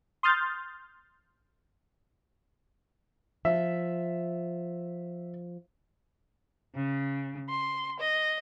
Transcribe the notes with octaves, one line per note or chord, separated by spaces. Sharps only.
C6 D#6 F6 G6 A6
F3 E5
C#3
C6
D#5